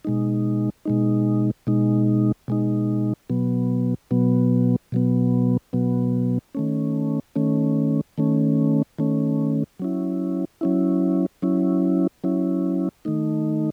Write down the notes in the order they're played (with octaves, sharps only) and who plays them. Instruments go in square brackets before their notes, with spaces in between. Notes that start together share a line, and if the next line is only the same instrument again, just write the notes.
[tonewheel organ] B2 G#3 D#4
B2 G#3 D#4
B2 G#3 D#4
B2 G#3 D#4
B2 F#3 B3
B2 F#3 B3
B2 F#3 B3
B2 F#3 B3
D#3 A3 C#4
D#3 A3 C#4
D#3 A3 C#4
D#3 A3 C#4
F#3 C#4 E4
F#3 C#4 E4
F#3 C#4 E4
F#3 C#4 E4
D#3 A3 D#4